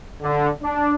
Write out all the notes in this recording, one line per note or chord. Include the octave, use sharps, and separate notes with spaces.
D3
D4